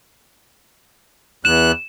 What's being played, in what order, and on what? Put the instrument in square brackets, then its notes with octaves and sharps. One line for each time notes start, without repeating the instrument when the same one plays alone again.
[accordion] E2 F#6 [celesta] E7